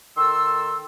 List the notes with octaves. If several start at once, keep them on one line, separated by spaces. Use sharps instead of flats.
D#3 A4 C6 E6